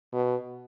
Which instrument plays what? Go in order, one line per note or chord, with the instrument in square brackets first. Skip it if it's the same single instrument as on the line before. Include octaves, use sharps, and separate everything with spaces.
[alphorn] B2